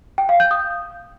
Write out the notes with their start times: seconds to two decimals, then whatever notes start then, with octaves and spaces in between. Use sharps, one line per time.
0.18 G5
0.29 F5
0.40 G6
0.51 D#6